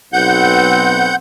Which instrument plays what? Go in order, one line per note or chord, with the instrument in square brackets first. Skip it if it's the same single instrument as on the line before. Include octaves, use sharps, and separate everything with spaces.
[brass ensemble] B1 B3 C4 [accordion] F#5 G6